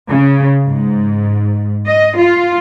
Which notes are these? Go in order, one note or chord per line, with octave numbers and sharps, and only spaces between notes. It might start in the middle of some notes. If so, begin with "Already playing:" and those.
C#3
G#2
D#5
F4